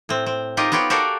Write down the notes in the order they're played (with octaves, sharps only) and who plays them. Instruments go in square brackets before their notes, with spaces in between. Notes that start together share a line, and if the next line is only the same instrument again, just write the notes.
[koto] A2 C4
C4
D#4 F4 G4 A#4 D#5
B3 F4 G4 C#5 G5
F#4 G4 A4 A#4 D5 F5